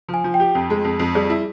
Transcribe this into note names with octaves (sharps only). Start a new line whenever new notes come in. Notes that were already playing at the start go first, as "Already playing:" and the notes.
F3
G#5
F3
G5
G4
F2
G#3
F2
F2
G3 G#4
E4